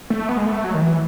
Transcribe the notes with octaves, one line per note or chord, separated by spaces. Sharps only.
A3
B3
G#3
A3
F#3
D#3
E3